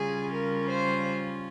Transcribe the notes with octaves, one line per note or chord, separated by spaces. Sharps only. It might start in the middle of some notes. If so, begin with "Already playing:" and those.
Already playing: C#3 G3 C#4 F4 G#4
A#4
C5